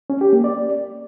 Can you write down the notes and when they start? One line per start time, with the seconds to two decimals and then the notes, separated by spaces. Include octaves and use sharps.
0.10 C#4
0.21 G4
0.33 A#3
0.44 D5